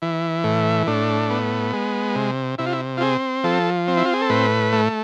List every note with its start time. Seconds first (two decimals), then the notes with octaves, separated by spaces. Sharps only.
0.02 E3
0.44 A2
0.87 A2 D4
1.30 B3
1.73 G#3
2.15 C3
2.58 C3 E4
2.66 F4
2.73 E4
2.97 F4
3.01 C4 G#4
3.44 F3 A4
3.88 C4
3.97 E4
4.05 F4
4.13 G#4
4.22 A4
4.29 A2 B4
4.73 A3